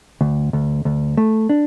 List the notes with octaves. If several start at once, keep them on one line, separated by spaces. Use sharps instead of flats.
D2
D2
D2
A3
D4